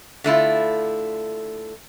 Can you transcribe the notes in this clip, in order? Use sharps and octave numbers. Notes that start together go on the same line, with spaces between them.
D3 A3 E4 F4